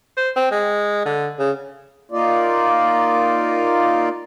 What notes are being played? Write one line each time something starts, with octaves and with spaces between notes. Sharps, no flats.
C5
C4
G#3
D3
C#3
A#3 D#4 F4 D5